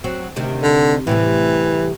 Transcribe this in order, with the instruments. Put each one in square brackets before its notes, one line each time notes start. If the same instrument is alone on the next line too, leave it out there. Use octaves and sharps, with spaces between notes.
[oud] F#3 C4
D2 C3 D#3
[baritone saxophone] D3
[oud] A2 C3 G3 [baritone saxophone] E3